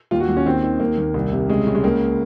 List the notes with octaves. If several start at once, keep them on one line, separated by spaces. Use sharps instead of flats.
D#2 F4
F#4
D#2
C#4
D#3 C4
D#3
D#2 A#3
D#2
C2
C3
C#3 G#3
C#3
G#3
C#2 A#3